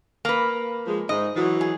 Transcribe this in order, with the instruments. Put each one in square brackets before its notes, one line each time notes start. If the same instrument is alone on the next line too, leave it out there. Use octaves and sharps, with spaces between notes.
[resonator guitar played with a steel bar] A#3 B4
[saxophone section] F3 G#3
[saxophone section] G#2 [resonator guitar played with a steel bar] D#5
[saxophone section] E3 F#3
[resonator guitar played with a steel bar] G#4